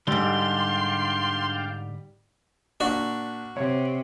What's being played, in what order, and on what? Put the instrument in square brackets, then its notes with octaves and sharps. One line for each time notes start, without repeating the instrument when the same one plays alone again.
[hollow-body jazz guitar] G#2 D3 [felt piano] G3 [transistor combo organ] D4 F5 G5 [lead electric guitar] C6
[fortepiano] A#2 D4 [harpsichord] F#4
[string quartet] C3 [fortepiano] C#5